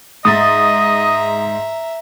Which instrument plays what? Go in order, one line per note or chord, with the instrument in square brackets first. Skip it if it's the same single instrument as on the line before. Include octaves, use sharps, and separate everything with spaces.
[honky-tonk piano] G#2 A6 [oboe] D#5 [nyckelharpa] E5 A#5 [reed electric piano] D#6